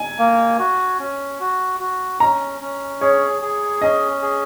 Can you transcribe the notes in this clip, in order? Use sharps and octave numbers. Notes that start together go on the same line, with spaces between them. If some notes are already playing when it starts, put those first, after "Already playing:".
Already playing: G#5
A#3
F#4
C#4
F#4
F#4
C#4 A#5
C#4
G#4 C#5
G#4
C#4 D#5
G#4